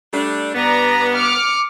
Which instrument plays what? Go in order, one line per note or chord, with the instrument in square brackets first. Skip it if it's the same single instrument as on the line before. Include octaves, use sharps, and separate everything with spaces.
[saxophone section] G3 A3 D4
[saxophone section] G2 B3 [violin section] D5 A#5
[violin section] D6 F6 C#7